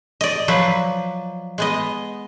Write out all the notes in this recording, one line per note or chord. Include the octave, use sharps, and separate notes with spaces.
D5 D#5
F3 F#3 B4
G#3 B3 D#5